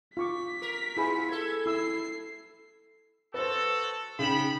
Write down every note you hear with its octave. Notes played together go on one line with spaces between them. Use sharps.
F4 C#6 D6 B6
A#4
B3 E4 F4 G#4 B5
A4 G#6
E4 E6 C7
F#4 A4 B4 C5
C#3 B3 D#4 G5 B5 E7